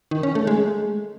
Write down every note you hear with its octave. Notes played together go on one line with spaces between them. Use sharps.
D#3
C#4
A3
G#3